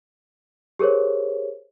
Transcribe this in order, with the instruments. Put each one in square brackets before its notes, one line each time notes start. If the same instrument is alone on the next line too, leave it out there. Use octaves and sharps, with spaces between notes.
[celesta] G4 G#4 A#4 C5 C#5